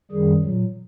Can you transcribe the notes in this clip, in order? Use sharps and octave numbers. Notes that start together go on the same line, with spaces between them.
F#2 D#3 G3 G#4
A#2 F#3